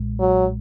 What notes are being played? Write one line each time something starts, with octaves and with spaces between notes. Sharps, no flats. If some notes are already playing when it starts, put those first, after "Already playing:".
Already playing: B1 A#2 G#3
F#3